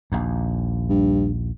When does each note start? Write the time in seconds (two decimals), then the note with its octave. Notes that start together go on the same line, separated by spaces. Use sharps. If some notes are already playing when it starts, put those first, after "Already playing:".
0.12 A#1 D#2
0.89 G2